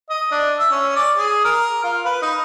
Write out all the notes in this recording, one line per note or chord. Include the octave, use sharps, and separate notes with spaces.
D#5
D4
E5
C#4
D5
G#4
A#4
F4
B4
D#4